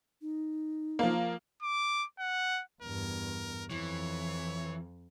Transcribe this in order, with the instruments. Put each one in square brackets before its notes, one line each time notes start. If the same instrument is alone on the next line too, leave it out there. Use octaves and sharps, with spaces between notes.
[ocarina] D#4
[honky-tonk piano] F3 A#3
[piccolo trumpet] D6
F#5
[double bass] E2 G2 [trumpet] A#4
[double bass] F2 [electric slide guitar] E3 [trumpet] C#5